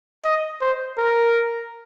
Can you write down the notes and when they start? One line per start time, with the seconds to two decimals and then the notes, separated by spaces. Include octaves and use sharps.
0.24 D#5
0.61 C5
0.98 A#4